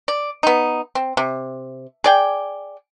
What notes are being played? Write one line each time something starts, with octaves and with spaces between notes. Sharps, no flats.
D5
B3 D#4
C4
C3
G#4 D5 G5